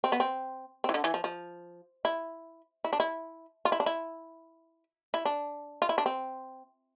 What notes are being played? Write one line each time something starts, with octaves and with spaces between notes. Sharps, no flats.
C4
B3
C4
C4
E3
D3
E3
F3
F3
E4
E4
D4
E4
F4
E4
D4
E4
E4
D4
F4
E4
D4
C4